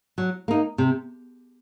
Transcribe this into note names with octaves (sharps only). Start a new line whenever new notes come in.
F#3
A#3 D#4
C3